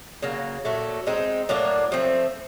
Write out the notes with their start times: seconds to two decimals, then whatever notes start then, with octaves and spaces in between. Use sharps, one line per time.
0.22 C#3 F#3 A#3
0.65 A#2 F#3 A3
1.07 G#3 C4 D#4
1.49 A2 F#3 A#3 D4
1.92 F3 A3 C4